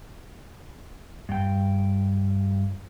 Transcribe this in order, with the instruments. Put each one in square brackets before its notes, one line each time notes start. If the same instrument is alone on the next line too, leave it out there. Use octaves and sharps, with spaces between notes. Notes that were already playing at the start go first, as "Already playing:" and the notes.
[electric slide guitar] G2 G5